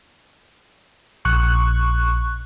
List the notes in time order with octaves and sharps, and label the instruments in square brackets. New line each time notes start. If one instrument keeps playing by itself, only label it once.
[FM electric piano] A#1 C#6 F#6